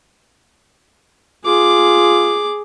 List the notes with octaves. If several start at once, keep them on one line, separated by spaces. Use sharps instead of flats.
F4 G#4 D6